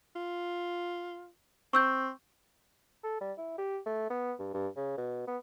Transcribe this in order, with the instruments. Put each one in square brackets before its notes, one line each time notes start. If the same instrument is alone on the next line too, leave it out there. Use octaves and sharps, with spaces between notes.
[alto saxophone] F4
[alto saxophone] C4 [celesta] C#6 E6 G6
[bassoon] A4
G3
E4
G4
A3
B3
G2
G2
C#3
B2
B3